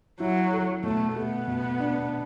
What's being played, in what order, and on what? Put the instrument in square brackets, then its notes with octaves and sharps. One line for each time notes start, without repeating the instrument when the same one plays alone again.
[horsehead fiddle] F#3 [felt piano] E4
[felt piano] A4
[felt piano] B2 [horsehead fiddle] A3
[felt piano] A3 [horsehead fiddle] B3
[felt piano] B2
D4